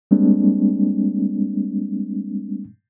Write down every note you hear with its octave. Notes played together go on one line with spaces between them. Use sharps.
G3 G#3 A#3 C4 D4